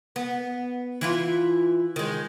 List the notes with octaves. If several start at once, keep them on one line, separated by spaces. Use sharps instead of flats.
B3
E3 E4 F4
D#3 G#3